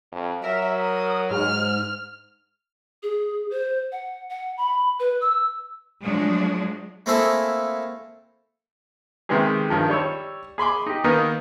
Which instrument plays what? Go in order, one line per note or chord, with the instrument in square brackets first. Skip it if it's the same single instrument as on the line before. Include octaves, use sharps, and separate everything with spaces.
[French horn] F2
[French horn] F#3 [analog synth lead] A#4 [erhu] E5
[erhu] D#6
[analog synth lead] G#2 [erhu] F6
[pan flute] G#4
C5
F#5
F#5
B5
B4
E6
[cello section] F3 F#3 G#3 A3 D4
[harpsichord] A3 A#3 C4 E4 G#4 A4
[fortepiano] C3 D#3 G#3 B3 G4 G#4
G2 D#3 F3
G3 C#5 E6
G#4 B5 C6 D6
D#4 G4
D#3 A#3 B3 D#4